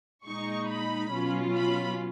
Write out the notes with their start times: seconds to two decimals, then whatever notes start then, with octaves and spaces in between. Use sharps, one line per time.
0.25 A#2 G#3 D#4 C#6
0.68 B5
1.12 B2 F#3 C#4 F4
1.56 B5